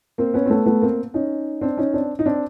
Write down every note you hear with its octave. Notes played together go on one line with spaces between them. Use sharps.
A#3 C4
B3 C#4
C4
A3 B3
A3 B3
A#3 C4
C#4 D#4
C4 D4
C#4 D#4
C4 D4
D#4
C4 D4